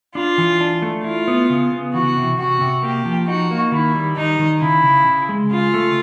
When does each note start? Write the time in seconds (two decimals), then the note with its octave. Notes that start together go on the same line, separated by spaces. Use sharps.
0.15 D4 F4
0.38 E3
0.60 D4
0.82 A3
1.04 E4 F4
1.28 B3
1.50 C#3
1.72 B3
1.94 E3 F#4
2.17 C3
2.38 C3 F#4
2.61 C3
2.83 A#3 G4
3.05 F3
3.27 D#4 F#4
3.51 A#3
3.72 D#3 E4
3.95 G3
4.17 D#3 D#4
4.39 D#3
4.61 C#3 E4
4.84 C#3
5.07 C#3
5.29 G#3
5.51 C#3 F4
5.74 A3